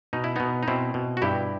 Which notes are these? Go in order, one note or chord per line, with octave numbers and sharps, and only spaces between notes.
B2 D#4
E4
B2 B3 D#4
D#4
B2 C4 E4
B2
F#4
G2 E4 G4